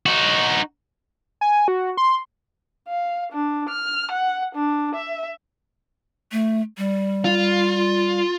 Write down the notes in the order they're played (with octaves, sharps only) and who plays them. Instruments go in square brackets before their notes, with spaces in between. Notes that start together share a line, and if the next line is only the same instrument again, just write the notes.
[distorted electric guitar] D#4 F#4
[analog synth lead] G#5
F#4
C6
[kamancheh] F5
D4
F6
F#5
D4
E5
[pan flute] A3
G3
[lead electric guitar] F4